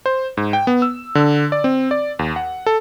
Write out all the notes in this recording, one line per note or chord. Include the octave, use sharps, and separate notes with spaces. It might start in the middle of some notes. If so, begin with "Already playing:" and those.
C5
G#2
G5
B3
E6
D3
D5
C4
D5
D#2
F#5
A4